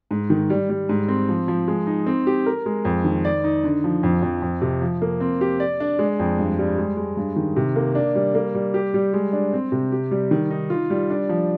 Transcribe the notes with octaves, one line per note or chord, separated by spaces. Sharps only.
G#2
D#3
G3
G3
G#2
C4
F3
F3
G#3
D#4
C4
G4
A#4
G#3
F2
D#3
D5
D#4
D3
F3
F2
F2
F2
C3
F3
A#3
C4
G4
D5
D4
G#3
F2
G2
G3
G#3
G#3
G2
D#3
C3
A#3
D4
G3
A#3
G3
G4
G3
G#3
D4
C4
C3
G4
G3
D#3
D#4
F4
G3
D4
F3